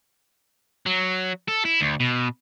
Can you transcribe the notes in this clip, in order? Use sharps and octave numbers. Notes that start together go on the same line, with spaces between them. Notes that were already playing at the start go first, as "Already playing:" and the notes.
F#3
A4
E4
D2
B2